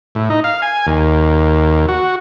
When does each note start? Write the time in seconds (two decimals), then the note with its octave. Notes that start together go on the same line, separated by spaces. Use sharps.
0.15 A2
0.30 D#4
0.44 F5
0.62 G#5
0.87 D#2
1.88 F#4